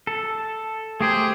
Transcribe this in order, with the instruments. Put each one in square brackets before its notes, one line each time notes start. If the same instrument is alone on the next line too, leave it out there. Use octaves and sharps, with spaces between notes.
[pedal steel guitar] A4
[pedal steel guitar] A3 G4 C5 [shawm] G#4